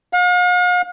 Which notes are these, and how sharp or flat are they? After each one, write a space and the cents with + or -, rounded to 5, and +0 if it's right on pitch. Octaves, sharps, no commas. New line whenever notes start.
F5 +45